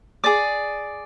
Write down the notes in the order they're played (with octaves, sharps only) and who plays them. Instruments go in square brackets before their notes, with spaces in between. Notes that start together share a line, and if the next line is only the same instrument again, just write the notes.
[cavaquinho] G#4 D5 D6